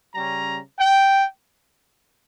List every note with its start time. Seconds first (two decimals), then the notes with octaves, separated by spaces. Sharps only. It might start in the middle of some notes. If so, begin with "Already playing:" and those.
0.14 C#3 G3 C#4 A#5
0.79 G5